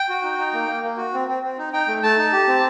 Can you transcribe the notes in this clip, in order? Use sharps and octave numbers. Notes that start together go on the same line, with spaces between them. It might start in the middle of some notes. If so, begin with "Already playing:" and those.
Already playing: G5
F#4
D#4
D#4
A#3
A#3
A#3
F#4
C4
C4
C4
D#4
D#4 G5
A3
A3 A5
D#4
G4
C4